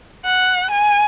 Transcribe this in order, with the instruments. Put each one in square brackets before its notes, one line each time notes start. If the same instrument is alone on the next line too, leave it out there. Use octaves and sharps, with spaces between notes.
[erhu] F#5
G#5